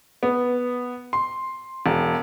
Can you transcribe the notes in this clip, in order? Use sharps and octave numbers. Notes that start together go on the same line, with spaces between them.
B3
C6
E1